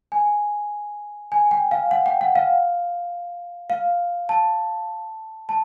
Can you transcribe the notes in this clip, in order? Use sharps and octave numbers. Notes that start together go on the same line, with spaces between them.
G#5
G#5
G5
F5
F#5
G5
F#5
F5
F5
A5
A5